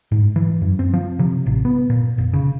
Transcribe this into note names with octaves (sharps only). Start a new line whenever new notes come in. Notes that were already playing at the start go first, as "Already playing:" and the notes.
G#2
E3
F#2
C4
F3
C3
A1
B3
A#2
F1
C#3